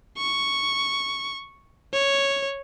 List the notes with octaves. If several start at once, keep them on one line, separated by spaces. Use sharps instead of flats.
C#6
C#5